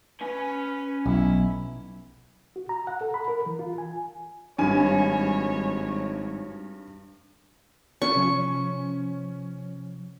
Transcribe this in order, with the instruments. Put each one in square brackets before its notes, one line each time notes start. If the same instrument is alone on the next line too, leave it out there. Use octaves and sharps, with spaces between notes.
[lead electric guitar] C#4 G#5 [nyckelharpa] B4
[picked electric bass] B1 [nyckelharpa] E4
[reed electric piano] F#4
A#5
F#5
A4
B5
A#4
E3
F4
G#5
[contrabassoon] G#1 [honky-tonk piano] G2 G#5 [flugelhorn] C#5
[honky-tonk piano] C#4 [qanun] C#6
[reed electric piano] C3 F3